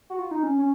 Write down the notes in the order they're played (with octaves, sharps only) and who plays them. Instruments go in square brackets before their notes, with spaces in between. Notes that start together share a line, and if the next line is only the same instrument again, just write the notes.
[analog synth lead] F#4
F4
D#4
C#4
C#4